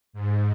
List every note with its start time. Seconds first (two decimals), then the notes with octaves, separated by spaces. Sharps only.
0.13 G#2